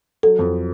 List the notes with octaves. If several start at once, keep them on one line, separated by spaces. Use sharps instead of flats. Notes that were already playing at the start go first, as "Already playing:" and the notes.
F#3 A4
F2